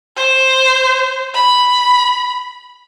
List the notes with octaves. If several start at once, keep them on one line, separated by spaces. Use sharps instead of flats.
C5
B5